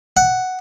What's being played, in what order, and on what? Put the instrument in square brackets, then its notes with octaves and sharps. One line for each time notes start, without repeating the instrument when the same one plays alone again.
[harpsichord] F#5